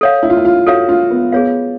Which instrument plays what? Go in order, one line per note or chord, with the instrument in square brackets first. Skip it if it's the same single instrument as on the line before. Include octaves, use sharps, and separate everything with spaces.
[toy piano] A4 C#5 F5
[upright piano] E4
F4
E4
F4
[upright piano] F#4 [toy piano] A4 C#5 F5
[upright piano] F4
B3
[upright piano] B3 [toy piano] G#4 C#5 F5